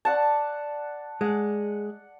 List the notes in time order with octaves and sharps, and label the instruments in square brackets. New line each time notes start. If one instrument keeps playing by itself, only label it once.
[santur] D5 F#5 A5
[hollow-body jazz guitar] G#3 [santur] F#5